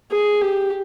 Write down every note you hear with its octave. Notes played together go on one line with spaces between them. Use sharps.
G#4
G4